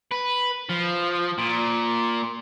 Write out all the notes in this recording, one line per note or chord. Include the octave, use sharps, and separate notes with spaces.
B4
F3
A#2